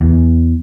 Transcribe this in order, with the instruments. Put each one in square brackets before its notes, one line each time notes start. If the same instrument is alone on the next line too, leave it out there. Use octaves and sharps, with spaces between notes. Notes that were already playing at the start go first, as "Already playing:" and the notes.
[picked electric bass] E2